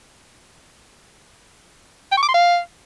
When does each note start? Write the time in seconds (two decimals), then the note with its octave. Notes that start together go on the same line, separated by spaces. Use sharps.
2.12 G5
2.17 C#6
2.23 D6
2.28 C6
2.34 F5